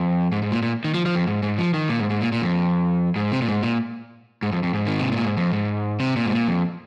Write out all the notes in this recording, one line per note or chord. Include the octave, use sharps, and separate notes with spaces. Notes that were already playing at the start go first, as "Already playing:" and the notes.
Already playing: F2
G#2
G#2
A#2
A#2
D#3
F3
F3
F2
G#2
G#2
F3
D#3
A#2
G#2
G#2
A#2
A#2
F2
G#2
C3
A#2
G#2
A#2
G#2
F2
F2
G#2
D#3
C3
A#2
G#2
F2
G#2
C3
A#2
G#2
A#2
F2